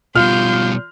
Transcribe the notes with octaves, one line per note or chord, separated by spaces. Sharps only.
B2 G3 F4 C6 F6 G6